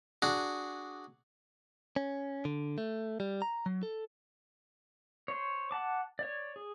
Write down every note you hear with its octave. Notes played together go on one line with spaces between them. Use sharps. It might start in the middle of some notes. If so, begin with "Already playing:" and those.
D4 F#4 G#4
C#4
D3
A3
G3
A#5
F#3
A4
C5 C#5
F#5 A5 D6
C#5 D5
G#4